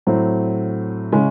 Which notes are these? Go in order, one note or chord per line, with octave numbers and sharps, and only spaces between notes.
A2 F#3 C4
C#3 G#3 C#4